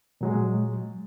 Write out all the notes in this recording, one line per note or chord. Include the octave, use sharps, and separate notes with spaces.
A#2 F#3 G#3